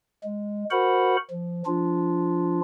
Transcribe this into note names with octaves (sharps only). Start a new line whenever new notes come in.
G#3
F#4 A#4 C5 F#5 B5
F3
F3 D4 F4